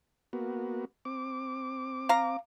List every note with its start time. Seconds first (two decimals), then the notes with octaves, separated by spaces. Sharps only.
0.33 A#3 B3 F#4
1.05 C4 D6
2.09 F5 A#5